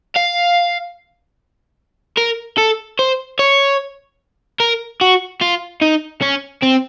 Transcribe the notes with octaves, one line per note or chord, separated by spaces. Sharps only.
F5
A#4
A4
C5
C#5
A#4
F#4
F4
D#4
C#4
C4